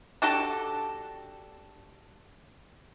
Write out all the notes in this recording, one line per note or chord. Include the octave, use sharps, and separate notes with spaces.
D4 F#4 G4 A4